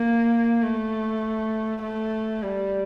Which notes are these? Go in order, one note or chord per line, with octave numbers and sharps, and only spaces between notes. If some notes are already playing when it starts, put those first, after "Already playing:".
Already playing: A#3
A3
A3
G3